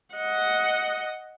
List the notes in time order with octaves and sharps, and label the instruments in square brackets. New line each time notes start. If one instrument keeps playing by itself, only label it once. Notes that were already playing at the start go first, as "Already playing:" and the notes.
[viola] D#5 F#5